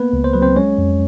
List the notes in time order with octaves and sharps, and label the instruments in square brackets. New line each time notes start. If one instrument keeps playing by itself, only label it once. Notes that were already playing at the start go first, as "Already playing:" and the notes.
Already playing: [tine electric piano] A#3 B3 B4
C#2
C5
F#3 B4
C4 C5
G#3 C#4 C#5
F2